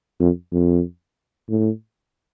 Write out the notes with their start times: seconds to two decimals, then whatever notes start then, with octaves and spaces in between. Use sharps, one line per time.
0.20 F2
0.52 F2
1.50 A2